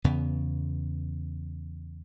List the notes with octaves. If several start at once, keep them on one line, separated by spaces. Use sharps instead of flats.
E2 C#3 B3